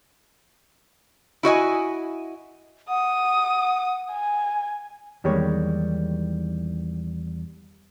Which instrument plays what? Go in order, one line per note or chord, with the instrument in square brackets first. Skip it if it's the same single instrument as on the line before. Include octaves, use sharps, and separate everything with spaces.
[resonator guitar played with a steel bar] E4 F#4 D#5 G#5
[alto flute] F#5 [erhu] D#6
[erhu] G#5
[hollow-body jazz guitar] E2 D#3 G3 G#3 A#3 C#5